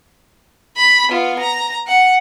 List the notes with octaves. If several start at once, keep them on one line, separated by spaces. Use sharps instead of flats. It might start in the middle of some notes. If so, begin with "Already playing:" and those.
B5
B3 F4
A#5
F#5